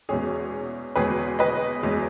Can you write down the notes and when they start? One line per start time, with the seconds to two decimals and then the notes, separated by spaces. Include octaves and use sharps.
0.09 E2 B2 G#3 C#4 G#4
0.96 E2 B2 G#3 C#4 G#4 B4
1.39 B4 D#5
1.83 E2 B2 G#3 C#4